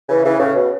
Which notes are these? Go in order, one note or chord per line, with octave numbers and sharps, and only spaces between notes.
C#3 E3
C#3 E3
A2 C#3
B2